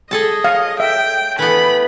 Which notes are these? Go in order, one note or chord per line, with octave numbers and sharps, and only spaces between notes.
G#4 A4 D#5 A5
C#5 F5
E5 G5
E3 A3 B3 B5